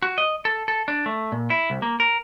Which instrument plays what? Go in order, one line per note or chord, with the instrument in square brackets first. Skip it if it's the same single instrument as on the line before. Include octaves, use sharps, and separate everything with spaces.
[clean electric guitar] F#4
D#5
A4
A4
D4
A3
A#2
E4
C2
A#3
A#4